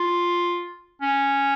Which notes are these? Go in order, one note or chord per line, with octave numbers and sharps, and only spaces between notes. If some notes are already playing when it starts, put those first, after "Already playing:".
Already playing: F4
C#4